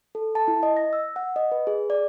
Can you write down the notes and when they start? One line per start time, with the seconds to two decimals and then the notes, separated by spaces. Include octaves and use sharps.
0.15 A4
0.35 A5
0.48 E4
0.63 D#5
0.77 A#6
0.93 E6
1.16 F#5
1.36 D#5
1.52 B4
1.67 G#4
1.90 D5